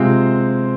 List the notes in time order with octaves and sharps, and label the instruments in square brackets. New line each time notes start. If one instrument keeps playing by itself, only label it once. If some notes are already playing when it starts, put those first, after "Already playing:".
Already playing: [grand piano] C3 G#3 C4 F4 C5